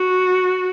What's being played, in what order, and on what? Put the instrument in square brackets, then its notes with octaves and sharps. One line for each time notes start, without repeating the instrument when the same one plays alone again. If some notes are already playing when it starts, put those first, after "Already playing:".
Already playing: [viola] F#4